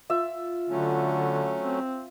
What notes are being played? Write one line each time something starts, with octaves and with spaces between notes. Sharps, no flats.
F4 E5
D3 F#3 A3 C#4
C4